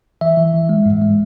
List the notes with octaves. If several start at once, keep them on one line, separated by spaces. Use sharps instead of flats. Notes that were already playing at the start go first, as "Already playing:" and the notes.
E3 E5
E3
E3
G#3
G#2
G#3